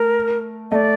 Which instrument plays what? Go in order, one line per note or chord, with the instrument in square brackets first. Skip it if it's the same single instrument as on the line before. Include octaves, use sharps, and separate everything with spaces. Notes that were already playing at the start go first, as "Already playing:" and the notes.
Already playing: [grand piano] A3 [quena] A#4
[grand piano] A3 [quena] D5 D#5